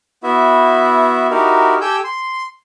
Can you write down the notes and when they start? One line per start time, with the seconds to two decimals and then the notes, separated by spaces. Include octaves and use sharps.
0.23 B3 E4 F#4 E5
1.31 D#4 E4 F#4 G4 A#4
1.81 G4 A4 G5 G#5 E6 G6
2.04 C6